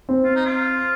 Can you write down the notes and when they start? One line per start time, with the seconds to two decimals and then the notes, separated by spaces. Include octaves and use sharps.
0.09 C4
0.25 F4
0.36 D#4
0.46 F4